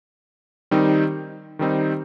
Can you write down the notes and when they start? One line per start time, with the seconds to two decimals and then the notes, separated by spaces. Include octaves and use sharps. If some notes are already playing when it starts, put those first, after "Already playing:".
0.71 D#3 G3 C4 D#4
1.59 D#3 G3 C4 D#4